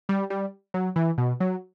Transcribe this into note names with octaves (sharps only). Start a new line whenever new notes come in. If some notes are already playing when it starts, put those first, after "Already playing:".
G3
G3
F#3
E3
B2
F#3